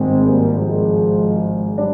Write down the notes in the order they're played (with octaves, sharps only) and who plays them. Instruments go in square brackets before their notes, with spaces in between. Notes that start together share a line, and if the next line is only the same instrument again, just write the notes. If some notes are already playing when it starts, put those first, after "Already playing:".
Already playing: [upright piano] G#1 G2 D#3 [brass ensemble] G#3 C4
[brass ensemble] G3 A#3
F3 G#3
[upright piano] G3 D4